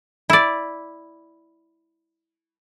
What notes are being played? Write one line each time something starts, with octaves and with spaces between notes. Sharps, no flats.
E4 D5